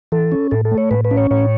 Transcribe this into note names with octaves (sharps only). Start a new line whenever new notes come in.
E3 A4
C#4
A2 A4
A4
A3
C#5
A2 B4
B4
C#4
C#5
A2 C#5